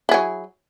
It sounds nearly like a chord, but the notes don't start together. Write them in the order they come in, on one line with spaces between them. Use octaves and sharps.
E4 G#4 F#3